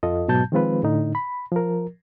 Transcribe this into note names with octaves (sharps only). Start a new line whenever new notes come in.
F2 F4 A4 D#5
G#2 B2 F#3 A5 G6
D#3 F3 G#3 C4 F4 B4
A2 D3 D#4
B5
F3 A#4